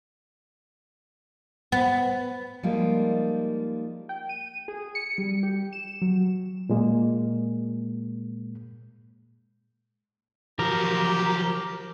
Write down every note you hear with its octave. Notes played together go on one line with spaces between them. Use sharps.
B3
F3 G3 G#3 A#3 D#4 F4
G5
D#7
G#4
C#7
G3
G4
E7
F#3
A#2 G#3 A#3
F3 F#3 G4 A#4